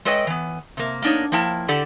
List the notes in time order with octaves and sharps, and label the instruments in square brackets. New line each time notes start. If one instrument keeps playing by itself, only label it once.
[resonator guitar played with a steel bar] G#3 A4 B4 C#5 D#5 G5
E3 B3
C3 A#3
A#3 B3 D4 D#4 C#5
F3 A#3 E4 G5 A5
D3 G4 A4 D5 F#5